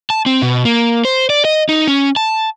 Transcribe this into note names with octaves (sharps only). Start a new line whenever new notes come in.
A5
C4
B2
A#3
C5
D5
D#5
D#4
C#4
A5